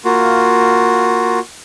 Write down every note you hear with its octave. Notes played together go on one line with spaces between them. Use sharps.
A#3 F4 F#4